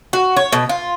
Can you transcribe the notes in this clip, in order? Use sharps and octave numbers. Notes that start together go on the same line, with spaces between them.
F#4
C#5
B2
F4